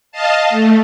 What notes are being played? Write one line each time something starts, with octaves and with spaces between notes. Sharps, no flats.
D#5 F5 A5
A3